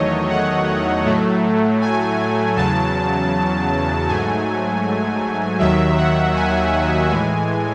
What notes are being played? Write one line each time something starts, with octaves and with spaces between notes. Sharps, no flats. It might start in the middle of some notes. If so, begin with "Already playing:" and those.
Already playing: E2 D#3 F#3 A3 C#5 D#5
F#5
A2 F#3 A3
G#5
E2 C#3 F#3 A5
G#2 F#3 A3 G#5
D#2 D#3 F#3 E5
F#5
G#5
F#5
A2 E3 G#3 G#5